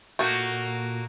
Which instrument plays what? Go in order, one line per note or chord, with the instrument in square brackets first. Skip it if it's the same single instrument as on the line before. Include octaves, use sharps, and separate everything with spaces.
[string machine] A#2 [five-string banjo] A3 D#4 [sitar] A#3 F#4